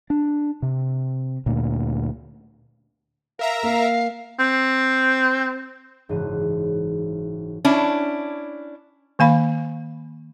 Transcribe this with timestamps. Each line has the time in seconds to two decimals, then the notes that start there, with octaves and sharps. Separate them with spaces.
0.10 D4
0.62 C3
1.46 D2 A#2
3.39 A#4 E5 F5 A#5
3.63 A#3 F5
4.39 C4
6.09 F#1 G#2 E3 C5 D#7
7.65 C#4 D4 E4
9.19 D#3 A#3 F5 B5